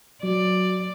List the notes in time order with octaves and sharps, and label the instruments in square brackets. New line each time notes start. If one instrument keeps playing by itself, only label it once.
[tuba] F#3 [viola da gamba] D5